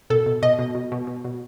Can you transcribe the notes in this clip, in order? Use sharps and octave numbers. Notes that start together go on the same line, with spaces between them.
B2 A4
B2
B2 D#5
B2
B2
B2
B2
B2